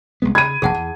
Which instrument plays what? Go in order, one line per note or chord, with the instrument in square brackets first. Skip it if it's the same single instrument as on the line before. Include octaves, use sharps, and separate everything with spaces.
[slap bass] C2 G#3 B3
[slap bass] C#3 [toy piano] B5 [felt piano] G#6 D#7
[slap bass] F1 A#1 B2 [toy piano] G#4 F#5 A5
[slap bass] E2